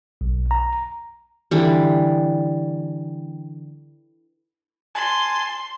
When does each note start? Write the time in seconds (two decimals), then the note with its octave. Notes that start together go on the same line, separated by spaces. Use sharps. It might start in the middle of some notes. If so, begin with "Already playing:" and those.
0.21 B1
0.51 A#5
1.51 D3 E3 G3
4.95 G#5 A5 C6